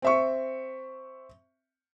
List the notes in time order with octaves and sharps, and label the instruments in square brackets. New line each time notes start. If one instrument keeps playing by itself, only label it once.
[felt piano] C4 E5 C#6